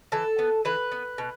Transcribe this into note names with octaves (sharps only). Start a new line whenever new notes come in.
E3 A4
B3
E3 B4
B3
B2